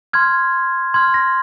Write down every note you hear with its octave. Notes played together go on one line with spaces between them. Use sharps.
C6 F6 G#6
C6 F6 G#6
A#6